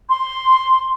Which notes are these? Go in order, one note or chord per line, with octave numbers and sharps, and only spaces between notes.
C6